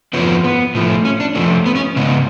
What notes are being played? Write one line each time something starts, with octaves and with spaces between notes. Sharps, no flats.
F2 F3 B3 C#4
B3
A2 F3 A3
C#4
D4
F2 F3 A3 C#4
B3
C#4
C#3 G#3 B3